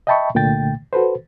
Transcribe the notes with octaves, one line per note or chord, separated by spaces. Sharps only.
D#5 E5 G5 A5 B5 C#6
C2 A#2 D3 A3 G5 A6
F#4 A4 B4 C5